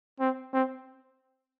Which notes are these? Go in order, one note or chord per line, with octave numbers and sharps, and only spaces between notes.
C4
C4